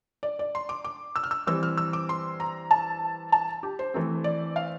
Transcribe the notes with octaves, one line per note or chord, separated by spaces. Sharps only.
D5
D5
C6
D6
D6
E6
F6
E6
E3 G3 C4 E6
F6
E6
D6
C6
A#5
A5
A5
G4
C5
E3 A3 C4
D5
F5